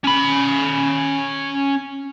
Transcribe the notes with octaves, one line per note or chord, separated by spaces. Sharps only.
C#4 B5